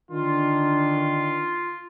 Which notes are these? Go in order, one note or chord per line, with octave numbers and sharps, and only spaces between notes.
D3 D#3 D4 F4